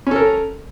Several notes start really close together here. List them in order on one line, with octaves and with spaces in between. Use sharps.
C#4 A4 A#4